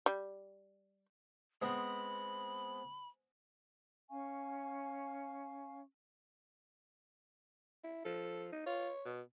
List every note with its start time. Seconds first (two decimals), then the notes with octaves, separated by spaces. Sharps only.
0.06 G3
1.62 G#3 B3 C4 B5
4.10 C#4 F5 G#5 C#6
7.84 E4
8.05 F3 A4
8.52 D#4
8.66 F4 C#5
9.06 B2